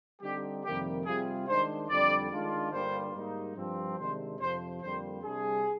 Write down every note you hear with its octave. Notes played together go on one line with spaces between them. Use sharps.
D3 G3 C4 D#4 G4
F2 C3 D#3 G3 A#3 G4
C3 G3 C4 F4 G#4
D#3 G#3 D4 C5
F2 D3 G3 D4 D5
D#3 G#3 D4 F4
G2 D3 G3 A#3 F4 C5
G#2 G3 A#3 D#4
G2 F3 C4
C3 D#3 G#3 D4 C5
F2 C3 F3 C5
F2 D3 G3 A#3 C5
C3 G3 D4 G#4